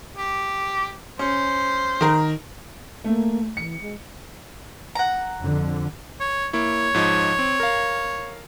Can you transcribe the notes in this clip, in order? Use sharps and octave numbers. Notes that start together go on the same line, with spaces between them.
G4
C#4 C5
D#3 A#4
A3 A#3
E3 C#7
G#3
F#5 A#5
F2 D3
C#5
A#3 E4 C#5
G#2 F3 D#4
C4
A#4 F5